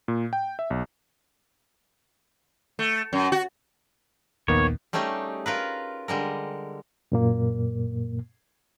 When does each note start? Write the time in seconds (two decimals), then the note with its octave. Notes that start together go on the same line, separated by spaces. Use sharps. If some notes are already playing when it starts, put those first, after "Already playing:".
0.08 A#2
0.33 G5
0.59 E5
0.70 B1
2.79 A3
3.13 F#2
3.32 F#4
4.48 D#1 A#1 D#2 D#3 A#3 B3 C#5
4.93 G3 A3 C#4 D#4 G4 G#4
5.46 F4 A#4 B4
6.08 D3 G3 G#3 A#4
7.12 F#2 A#2 A#3